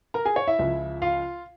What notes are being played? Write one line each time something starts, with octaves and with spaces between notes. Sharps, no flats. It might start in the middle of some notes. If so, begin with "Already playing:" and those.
A#4 A#5
G#4 G#5
C#5
E4 E5
C#2 C#3 F3
F4 F5